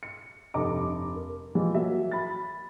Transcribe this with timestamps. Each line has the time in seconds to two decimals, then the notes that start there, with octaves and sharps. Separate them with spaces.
0.03 C#7
0.54 F1 G2 A4 D#5 A#5 D6
1.16 A#4
1.55 E3 F3 G3 G#3
1.74 F#3 A#3 E5
2.11 B5 A6